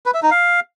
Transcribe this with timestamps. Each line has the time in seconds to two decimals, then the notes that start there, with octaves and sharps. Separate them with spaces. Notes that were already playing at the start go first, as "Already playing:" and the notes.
0.06 B4
0.14 E5
0.22 D#4
0.31 F5